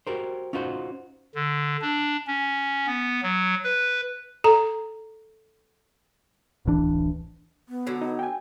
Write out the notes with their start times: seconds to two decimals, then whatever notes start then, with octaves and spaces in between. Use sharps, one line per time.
0.07 F#4 G4 A#4 C5
0.53 C#4 D#4 F4 F#4 B4 C5
1.35 D3
1.82 D4
2.27 C#4
2.87 B3
3.23 F#3
3.64 B4
4.44 A4 A#5
6.65 D1 A1 E3 D4
7.69 B3
7.87 D3 F#3
8.02 D#4
8.19 G5 G#5